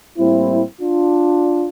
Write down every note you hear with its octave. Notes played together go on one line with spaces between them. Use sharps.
A2 G3 A#3 C4 E4
D4 F4